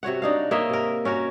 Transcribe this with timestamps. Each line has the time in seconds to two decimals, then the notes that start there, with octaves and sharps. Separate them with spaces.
0.03 C3 F#4 C#5 F#5
0.22 D4 D#4 F5
0.51 A#3 C#5 D#5 E5
0.70 C3 A#4
1.05 C#4 F#4 A#4